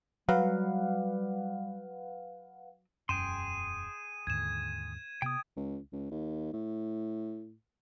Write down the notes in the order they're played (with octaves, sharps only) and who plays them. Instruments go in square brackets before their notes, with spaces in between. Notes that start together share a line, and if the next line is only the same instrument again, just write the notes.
[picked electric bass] F#3 [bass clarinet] G3 [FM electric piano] B4 F5 F#5
[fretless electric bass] E1 F#2 [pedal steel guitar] G#4 G5 C6 [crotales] D#7 E7
[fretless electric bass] D#2 G#2 D3 [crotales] G#6 E7
[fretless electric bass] C3 B3 [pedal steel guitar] G5 D#6
[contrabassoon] C#2
C#2
D#2
A2